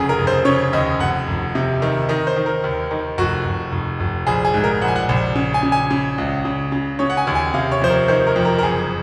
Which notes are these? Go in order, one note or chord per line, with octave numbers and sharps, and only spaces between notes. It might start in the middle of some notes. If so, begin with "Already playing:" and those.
Already playing: F1 C#3 G#4
A#4
F1
C5
C#3 C#5
D#2 D#5
F1 F#5
F1
C3
D#3
D#3 D#5
C5
D#3
A#4
D#2
D#3
F1 F#4
F1
F1
F1
A#1 G#4
G#4
G#2
A#4
A#1 F#5
G#5
F#5
A#1
C#3
G#5
C#3
G#5
C#3
C#2
C#3
C#3
C#3 C#5
F#5
G#5
D#2
G#5
C3 F5
C#5
F2 C5
A#4
D#3 C5
A#4
F2
A#4
A#4
F#1 G#4